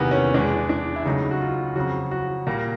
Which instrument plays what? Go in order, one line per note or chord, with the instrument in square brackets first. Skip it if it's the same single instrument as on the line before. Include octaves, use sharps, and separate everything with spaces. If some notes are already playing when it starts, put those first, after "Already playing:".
Already playing: [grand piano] E2 C3 D#3 G3 A#3 B3
C#4
E2 B2 G#3 D4
D4
E4
C#2 C#3 F#3 A3 D#4
F#4
F4
F2 C#3 F#3 F#4
F#4
A#2 G3 A#3